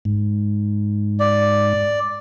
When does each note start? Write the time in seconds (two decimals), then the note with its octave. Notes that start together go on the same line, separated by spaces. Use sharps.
0.05 G#2
1.20 D5